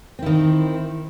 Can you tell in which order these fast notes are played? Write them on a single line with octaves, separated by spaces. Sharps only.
C4 E4 D#3